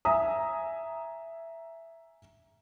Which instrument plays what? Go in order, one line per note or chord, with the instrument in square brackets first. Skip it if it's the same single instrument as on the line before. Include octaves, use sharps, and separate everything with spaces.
[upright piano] E5 G#5 A#5 D#6